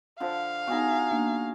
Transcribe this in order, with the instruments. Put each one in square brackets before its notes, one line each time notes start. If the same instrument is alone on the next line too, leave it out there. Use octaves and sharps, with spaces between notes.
[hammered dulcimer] D3 F3 [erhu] F5
[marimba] B3 D#4 [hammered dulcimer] F#4 G#4 A#5
[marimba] A#3 D4